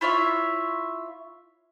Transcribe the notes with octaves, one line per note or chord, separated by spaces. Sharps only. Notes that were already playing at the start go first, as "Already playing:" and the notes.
E4 F4 C#5 E5